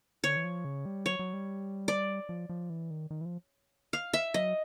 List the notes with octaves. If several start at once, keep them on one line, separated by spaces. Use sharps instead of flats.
D3 C#5
E3
F3
C#3
G3
F#3 C#5
F#3
G3
D5
F3
F3
E3
D#3
D#3
E3
F3
F5
E5
F#3 D#5